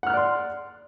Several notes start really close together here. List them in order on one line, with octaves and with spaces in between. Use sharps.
F#5 F6 F#6 D5 C6